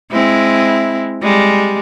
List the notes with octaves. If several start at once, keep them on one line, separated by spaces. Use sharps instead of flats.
G#3 C4 E4
G3 G#3